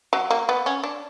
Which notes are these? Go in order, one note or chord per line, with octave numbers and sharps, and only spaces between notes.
F#3
A#3
B3
C#4
D4